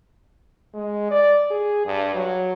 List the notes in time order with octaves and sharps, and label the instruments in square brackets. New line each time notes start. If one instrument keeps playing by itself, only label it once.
[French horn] G#3
D5
G#4
G2
F#3